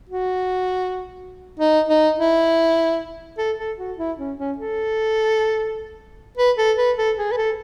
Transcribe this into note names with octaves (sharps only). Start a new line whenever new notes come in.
F#4
D#4
D#4
E4
A4
A4
F#4
E4
C#4
C#4
A4
B4
A4
B4
A4
G#4
B4
A4